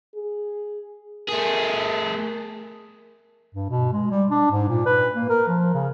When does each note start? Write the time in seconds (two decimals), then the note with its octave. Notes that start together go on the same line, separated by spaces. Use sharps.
0.15 G#4
1.29 A3 G#4 A#4
3.54 G2
3.69 B2
3.93 G#3
4.11 G3
4.31 D4
4.51 G#2
4.68 A#2
4.86 B4
5.14 A#3
5.29 A#4
5.48 F3
5.74 C#3